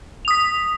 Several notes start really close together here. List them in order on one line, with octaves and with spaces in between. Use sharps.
F7 D#6 B6